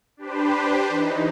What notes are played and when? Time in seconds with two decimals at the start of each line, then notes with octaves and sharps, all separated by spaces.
0.17 D4 G4 B4 C5
0.89 E3 D#4